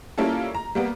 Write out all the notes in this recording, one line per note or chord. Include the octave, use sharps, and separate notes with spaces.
G3 A#3 C#4 E4 F4 A4
A#5
G3 A#3 B3